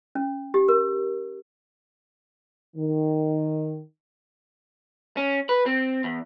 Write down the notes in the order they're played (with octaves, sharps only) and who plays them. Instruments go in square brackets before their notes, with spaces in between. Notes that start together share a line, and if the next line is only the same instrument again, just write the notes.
[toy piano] C#4
G4
A#4
[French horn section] D#3
[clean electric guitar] C#4
B4
C4
E2